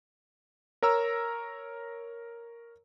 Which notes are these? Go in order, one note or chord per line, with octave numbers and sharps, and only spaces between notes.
A#4 C#5 A#5 E6